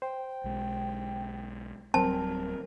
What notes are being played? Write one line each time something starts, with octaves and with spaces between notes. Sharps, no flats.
C5 G5
B1 G#3
D1 F#3 G3 C4 A#4 A5